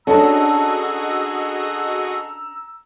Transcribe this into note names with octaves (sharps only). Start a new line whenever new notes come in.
C#4 D4 F#4 G#4 A4 D#5 A#5 E6